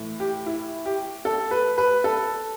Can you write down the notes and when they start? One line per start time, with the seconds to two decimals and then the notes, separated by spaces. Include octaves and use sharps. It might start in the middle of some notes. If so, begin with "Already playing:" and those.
Already playing: A2 E3
0.20 G4
0.46 E4
0.86 G4
1.25 A4
1.51 B4
1.78 B4
2.04 A4